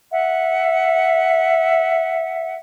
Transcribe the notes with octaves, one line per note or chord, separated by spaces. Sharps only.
E5 F#5